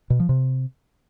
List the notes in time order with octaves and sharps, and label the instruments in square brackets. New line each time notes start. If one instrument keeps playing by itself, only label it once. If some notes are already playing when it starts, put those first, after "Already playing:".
[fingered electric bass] B2
F3
C3